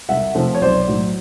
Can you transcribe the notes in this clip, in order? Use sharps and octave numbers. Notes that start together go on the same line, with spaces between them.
C2 E5 F#5
C3 F3 A3 C4
C#5
B1 C5 D5
A2 F#3